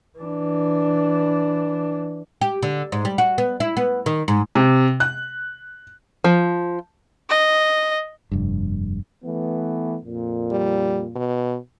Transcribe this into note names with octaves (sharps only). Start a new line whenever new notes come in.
E3 D4
G4
D3
G#2
G3
F#4
B3
E4
B3
D#3
G#2
C3
F#6
F3
D#5
F1 G2
E3 A3 B3
F2 A#2
G3
B2